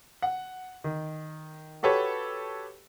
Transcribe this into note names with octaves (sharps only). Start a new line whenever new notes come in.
F#5
D#3
F#4 G4 A4 B4 C#5